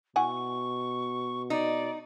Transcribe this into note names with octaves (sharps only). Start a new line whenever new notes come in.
B2 E4 F#5 G#5 C#6
D#4 D5